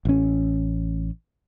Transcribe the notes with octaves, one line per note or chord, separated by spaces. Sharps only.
A1 C#4